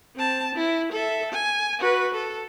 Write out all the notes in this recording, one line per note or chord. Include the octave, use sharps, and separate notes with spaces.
C4 A5
E4
A4 E5
G#5
F#4 B4
A4